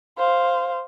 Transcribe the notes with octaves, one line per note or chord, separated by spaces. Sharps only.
C5 F5